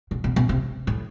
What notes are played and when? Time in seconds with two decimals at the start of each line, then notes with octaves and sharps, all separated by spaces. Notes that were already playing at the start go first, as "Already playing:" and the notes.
0.11 B2
0.24 B2
0.36 B2
0.49 C3
0.87 A2